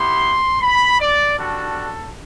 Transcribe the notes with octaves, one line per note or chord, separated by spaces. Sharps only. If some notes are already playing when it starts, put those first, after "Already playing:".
Already playing: B3 E4 G4 C6
B5
D5
G3 D4 F#4 A4